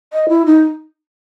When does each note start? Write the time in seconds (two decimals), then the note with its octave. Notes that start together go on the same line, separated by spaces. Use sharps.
0.13 D#5
0.29 E4
0.46 D#4